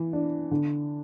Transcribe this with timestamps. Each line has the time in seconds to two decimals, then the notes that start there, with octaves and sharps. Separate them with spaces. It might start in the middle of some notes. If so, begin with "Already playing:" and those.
Already playing: E3
0.13 D4
0.51 D3